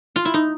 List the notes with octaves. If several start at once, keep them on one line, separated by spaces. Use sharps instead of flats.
F4
E4
D#4